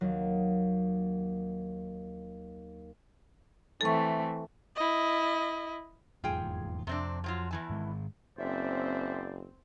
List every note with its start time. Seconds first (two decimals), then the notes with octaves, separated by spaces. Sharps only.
0.01 D#2 F#3
3.81 E3 A3 C4 A4 C#6
4.76 E4 D#5
6.24 F1 E2 G#2 F4 G#4 G5
6.87 F2 C3 C4 D4
7.24 F3 F#3 F4
7.51 E2 E3 A5
7.70 G#2 D#3 G#3
8.38 F#1 C4 C#4 C5 D5 E5